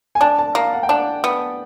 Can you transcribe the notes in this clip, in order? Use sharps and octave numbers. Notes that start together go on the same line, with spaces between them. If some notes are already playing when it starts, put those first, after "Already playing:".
G#5
D4 A5
A5
A#3
F#5
G5
D4 F#5
B3